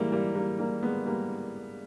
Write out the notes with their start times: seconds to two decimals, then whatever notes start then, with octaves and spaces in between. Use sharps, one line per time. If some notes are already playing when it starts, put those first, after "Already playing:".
Already playing: E3 G3 G#3 A#3
0.12 G3 A#3
0.35 G3 A#3
0.59 G3 A#3
0.83 G#3 B3
1.06 G3 A#3